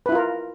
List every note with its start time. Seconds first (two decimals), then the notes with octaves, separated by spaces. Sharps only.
0.06 B4
0.09 E4
0.12 F4
0.15 A#4